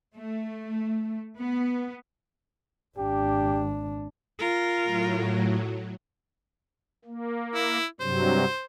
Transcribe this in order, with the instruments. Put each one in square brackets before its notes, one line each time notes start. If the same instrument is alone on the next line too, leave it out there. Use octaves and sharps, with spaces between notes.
[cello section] A3
B3
[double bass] G#1 D4 [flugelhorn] G4
[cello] F4 A#4
[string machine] A2 F#3
[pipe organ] A#3
[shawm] E4
[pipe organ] G2 C3 F#3 [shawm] C5